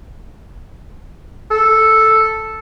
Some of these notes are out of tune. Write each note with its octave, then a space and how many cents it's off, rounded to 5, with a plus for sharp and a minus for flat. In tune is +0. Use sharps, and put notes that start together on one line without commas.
A4 +0